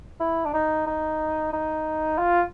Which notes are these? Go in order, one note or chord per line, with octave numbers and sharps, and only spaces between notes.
E4
D4
D#4
D#4
D#4
F4